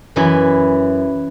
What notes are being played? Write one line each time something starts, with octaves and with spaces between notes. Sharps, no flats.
F#2 E3 B4